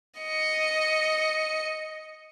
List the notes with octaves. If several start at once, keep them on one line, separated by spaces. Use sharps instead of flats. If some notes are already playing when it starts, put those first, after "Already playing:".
D#5 C#7